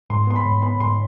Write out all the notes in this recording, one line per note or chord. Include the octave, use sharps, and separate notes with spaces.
G#2 C6
B3 C6
B5
G#2
B3 B5
G#2 C6